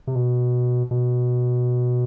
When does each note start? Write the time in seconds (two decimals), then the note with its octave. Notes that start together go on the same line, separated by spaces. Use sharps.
0.07 C3
0.15 B2
0.91 B2